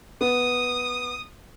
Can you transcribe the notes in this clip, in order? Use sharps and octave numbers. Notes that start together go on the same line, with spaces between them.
B3 D#6